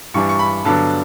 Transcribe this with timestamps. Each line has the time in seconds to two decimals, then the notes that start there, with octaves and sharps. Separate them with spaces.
0.14 G2 E3 G3 D4 C#6
0.29 C#6
0.39 B5
0.65 G2 D3 F#3 B3 D4 A5